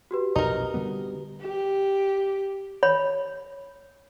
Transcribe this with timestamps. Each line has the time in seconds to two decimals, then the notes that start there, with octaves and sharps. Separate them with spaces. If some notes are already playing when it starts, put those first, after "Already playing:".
0.11 F#4 G4 B4
0.36 B1 F2 A#2 D#4 A#4
0.74 D3 G3 B3
1.41 G4
2.83 C#5 B5